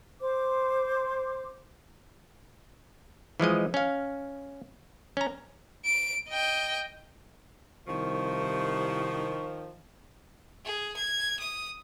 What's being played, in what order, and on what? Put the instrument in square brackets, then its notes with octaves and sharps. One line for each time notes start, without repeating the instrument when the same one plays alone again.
[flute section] C5 D6
[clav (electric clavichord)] E3 F3 G#3 D#5
C#4 F5
C#4 A#5
[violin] D7
D#5 G5
[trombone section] C2 [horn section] D#3 F3 [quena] C#6
[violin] G#4
G#6
D#6